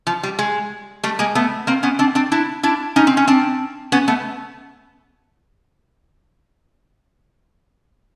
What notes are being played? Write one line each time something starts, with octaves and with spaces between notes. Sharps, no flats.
F3
G3
G#3
G3 A3
G#3 A#3
A3 B3
A#3 C4
B3 C#4
C4 D4
C4 D4
D4 E4
D4 E4
C#4 D#4
C4
C#4
C4 D4
B3 C#4
A3 B3